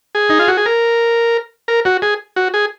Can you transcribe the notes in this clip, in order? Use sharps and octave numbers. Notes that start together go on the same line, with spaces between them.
G#4
D#4
F4
F#4
G#4
A#4
A#4
F#4
G#4
F#4
G#4